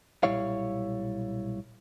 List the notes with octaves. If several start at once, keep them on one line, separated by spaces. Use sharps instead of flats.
B1 A#2 G3 E4 C#5 F5